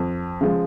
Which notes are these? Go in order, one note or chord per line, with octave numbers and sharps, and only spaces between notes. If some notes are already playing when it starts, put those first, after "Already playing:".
Already playing: F2
C#3 F3 G#3